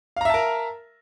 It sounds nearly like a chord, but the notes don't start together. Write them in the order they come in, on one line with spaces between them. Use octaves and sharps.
F5 A#5 E5 A5 A#4